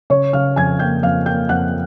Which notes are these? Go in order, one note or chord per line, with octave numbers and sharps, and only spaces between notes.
C#3 C#5 C#6
C#3 F5 F6
F2 G#5 G#6
A#3 G5 G6
F2 F5 F6
A#3 G5 G6
F2 F#5 F#6